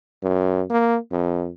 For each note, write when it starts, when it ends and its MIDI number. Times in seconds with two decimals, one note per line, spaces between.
0.23 0.62 42
0.70 0.96 58
1.12 1.49 41